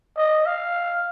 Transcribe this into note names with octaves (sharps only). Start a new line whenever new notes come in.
D#5
F5